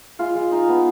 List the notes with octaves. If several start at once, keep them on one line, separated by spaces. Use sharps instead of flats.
G#3 F4
G#3
D#4
B3